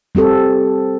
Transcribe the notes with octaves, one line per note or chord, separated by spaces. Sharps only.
G3 C4 G4 A4